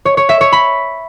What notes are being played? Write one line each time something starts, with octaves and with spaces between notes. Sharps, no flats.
C#5
C#5
E5
C#5
B5